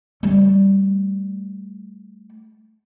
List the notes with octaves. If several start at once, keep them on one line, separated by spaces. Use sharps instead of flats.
G3 A3